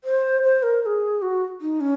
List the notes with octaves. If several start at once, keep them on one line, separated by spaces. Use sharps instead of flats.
C5
C5
A#4
A#4
G#4
F#4
D#4
C#4